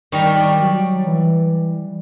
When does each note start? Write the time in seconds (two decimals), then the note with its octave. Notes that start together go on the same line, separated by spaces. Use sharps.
0.12 D#3 G3 A#5 C#6
0.36 D5
0.60 F#3
1.07 E3